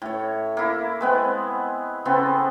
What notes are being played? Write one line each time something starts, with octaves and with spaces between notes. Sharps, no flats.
A2 C#5
A#3 E4
G#3 B3 C4
C#3 B3 C4 A4